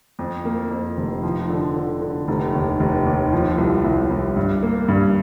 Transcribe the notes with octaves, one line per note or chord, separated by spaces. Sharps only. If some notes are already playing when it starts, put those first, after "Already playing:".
F2
A#3
F2
F1
F3
D3
D3
D3
F1
D#2
F1
D#2
F3
C2
C2
C2
G2
A#3
G2